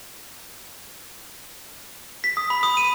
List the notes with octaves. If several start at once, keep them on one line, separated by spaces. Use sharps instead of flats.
B6
D#6
B5
D#6
D#7